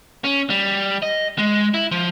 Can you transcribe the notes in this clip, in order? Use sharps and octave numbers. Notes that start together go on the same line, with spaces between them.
C#4
G3
D#5
G#3
E4
F3